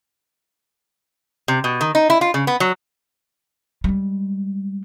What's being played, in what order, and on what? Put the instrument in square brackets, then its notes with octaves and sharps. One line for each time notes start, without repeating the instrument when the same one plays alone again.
[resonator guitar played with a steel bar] C3
B2
D#3
D#4
E4
F4
C#3
B3
F#3
[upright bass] G3 G#3